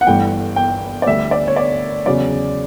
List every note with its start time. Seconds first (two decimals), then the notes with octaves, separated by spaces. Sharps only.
0.01 F#5
0.07 G1 G2 E3 A3 G5
0.56 G5
1.02 D5
1.06 D2 D3 G3 E5
1.31 D5
1.47 C#5
1.56 D5
2.06 E2 C#3 F#3 C#4 D5